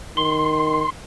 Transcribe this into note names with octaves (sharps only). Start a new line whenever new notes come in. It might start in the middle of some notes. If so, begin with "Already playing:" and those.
D#3 C6